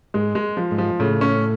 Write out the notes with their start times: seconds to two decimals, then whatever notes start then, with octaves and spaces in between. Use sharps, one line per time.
0.14 G#2 G#3
0.35 G#3
0.57 F3
0.71 G#2
0.78 F3
1.00 A2 C#3
1.21 C#4